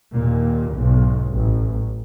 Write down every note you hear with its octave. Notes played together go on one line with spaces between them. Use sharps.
D#2 A#2
B1 G#2
A1